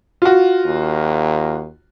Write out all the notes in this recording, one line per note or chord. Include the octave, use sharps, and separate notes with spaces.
F4 F#4
D#2